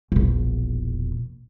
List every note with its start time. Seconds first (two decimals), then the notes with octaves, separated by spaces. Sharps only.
0.12 E1 A#1